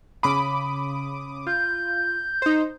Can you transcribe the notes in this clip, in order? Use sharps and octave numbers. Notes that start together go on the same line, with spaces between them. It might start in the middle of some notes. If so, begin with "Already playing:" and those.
C#3 B5 D6 D#6
F4 G6
D#4 C5